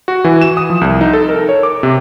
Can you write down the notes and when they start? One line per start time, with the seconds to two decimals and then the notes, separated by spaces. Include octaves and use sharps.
0.08 F#4
0.24 E3
0.41 E7
0.57 D#6
0.70 F3
0.81 C2
1.01 D#4
1.13 A4
1.29 A#4
1.49 C#5
1.63 D6
1.83 C3